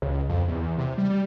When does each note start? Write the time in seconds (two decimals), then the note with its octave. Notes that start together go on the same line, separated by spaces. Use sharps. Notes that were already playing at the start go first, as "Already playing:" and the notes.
0.02 C#2
0.29 F2
0.48 E2
0.63 E2
0.78 C3
0.98 G3
1.10 G3